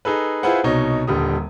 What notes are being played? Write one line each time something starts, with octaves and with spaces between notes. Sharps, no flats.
D#4 G#4 A4 B4
E4 F4 G#4 B4 C5 F#5
C2 B2 D#4 C#5
D#1 D3 G3 D#6